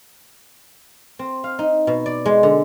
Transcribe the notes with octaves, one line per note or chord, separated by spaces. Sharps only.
C4
F5
D#4
B2
D5
G#3
D3